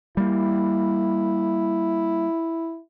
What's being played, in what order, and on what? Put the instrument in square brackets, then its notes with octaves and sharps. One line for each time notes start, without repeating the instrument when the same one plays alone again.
[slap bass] G3 A#3 [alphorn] E4